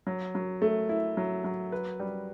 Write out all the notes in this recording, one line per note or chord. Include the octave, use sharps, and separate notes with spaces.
F#3
F#3
A3
E4
F#3
F#3
B4
G3